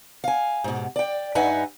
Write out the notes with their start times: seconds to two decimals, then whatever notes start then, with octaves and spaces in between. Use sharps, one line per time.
0.24 F5 G#5
0.64 G#2 B2
0.96 D5 G5
1.35 G2 D#4 B4 E5 F#5 G#5